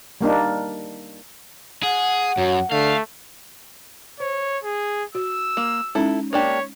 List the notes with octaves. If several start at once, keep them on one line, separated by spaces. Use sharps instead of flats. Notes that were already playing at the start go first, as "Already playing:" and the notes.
G3 A#3 D4 D#4
G#4 F#5
F#2 F#3
D3 A3 F5
C5 C#5
G#4
F#4 E6
A#3
G#3 C#4 D#4 E4 A4
A#3 D4 G4 C#5